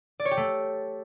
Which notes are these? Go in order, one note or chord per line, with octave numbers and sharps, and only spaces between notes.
D5
C#5
G4
A3